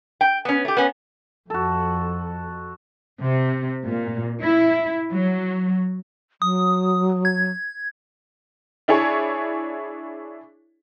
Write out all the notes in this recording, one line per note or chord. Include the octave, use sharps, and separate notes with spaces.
G5
B3 C#4
A3 G4
B3 C#4
F2 F#4 A4
C3
A#2
E4
F#3
F#3 D#6
G#6
D4 E4 G#4 C#5